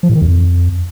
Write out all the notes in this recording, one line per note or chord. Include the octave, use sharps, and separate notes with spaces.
F3
A2
D#3
E2
F2